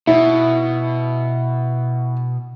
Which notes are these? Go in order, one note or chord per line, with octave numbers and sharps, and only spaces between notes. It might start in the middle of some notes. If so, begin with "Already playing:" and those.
B2 E4